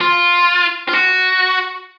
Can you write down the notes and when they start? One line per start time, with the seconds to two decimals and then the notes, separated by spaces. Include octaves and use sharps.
0.01 F4
0.89 F4
0.93 F#4